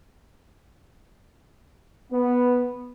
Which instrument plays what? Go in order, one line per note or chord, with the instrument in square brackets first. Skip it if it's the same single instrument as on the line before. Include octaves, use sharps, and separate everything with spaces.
[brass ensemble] B3